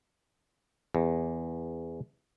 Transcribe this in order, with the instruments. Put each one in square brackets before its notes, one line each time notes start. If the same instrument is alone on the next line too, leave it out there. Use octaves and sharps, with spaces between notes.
[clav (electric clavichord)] E2